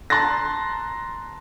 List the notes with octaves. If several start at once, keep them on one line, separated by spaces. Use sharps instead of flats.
A5 A#5 C6 F#6 A6 A#6